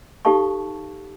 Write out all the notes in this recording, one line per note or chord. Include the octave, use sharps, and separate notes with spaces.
D#4 G4 A4 F5 A5 C#6